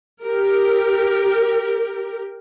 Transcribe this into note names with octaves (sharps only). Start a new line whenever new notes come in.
G4 A#4